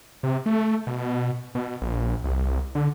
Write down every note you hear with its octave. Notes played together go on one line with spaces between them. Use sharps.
C3
A3
B2
B2
A#1
C2
D3